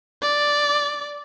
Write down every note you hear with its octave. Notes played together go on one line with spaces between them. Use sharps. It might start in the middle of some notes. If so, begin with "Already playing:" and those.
D5